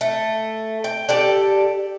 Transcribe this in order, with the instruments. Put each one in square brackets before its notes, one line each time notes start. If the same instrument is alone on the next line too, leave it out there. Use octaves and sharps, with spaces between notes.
[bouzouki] A3
G5
G4 A4 D5